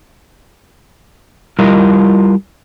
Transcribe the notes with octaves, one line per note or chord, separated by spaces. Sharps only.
G3 E4 F4 A#4 D#5